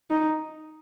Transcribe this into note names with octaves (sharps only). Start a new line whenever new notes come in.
D#4